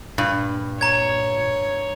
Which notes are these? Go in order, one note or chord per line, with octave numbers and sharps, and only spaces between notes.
G2 A#2
C#5 A#5 G#6